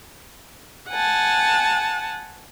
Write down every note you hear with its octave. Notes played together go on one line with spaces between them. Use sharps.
F#5 G#5 A5